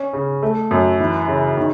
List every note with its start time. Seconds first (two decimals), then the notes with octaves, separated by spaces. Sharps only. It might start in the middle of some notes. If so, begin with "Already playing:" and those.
Already playing: C#4
0.13 C#3
0.43 A3
0.71 F#2
1.00 E3
1.28 C#3
1.57 D#3